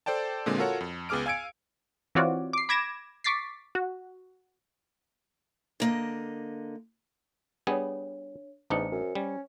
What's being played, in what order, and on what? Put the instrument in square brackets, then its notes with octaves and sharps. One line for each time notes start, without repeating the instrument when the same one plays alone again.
[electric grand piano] A4 C5 D5 G5 A5
A#2 D3 G#3 A#3 C4
F4 F#4 A4 A#4 C#5 F#5
F2
C#2 B3 G#4 D6 F6 D7
F5 G#5 E6 G#6 C#7 D7
[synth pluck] E3 C4 F4 F#4 C#5 D5
D6 C7
B5 D6 G#6 A#6 D7 E7
C#6 D6 A6 B6 C7
F#4
[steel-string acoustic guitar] D3 A#3 D#5
[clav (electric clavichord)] G3 B3 G#4 [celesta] D4 C#5
[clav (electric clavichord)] A1 D4 D#4 [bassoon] E2 [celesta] C5 C#7
[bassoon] F#2
[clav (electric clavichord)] G3 [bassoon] C#4